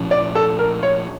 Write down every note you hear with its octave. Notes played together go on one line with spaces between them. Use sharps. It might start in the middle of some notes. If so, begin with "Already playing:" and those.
Already playing: A#2 F3 C#4
D5
A4
A#4
C#5